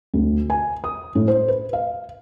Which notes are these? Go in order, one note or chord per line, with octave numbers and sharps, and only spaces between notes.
D2
G#5
D#6
A2
C5
B4
F5